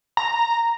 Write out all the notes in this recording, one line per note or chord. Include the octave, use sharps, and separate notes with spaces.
A#5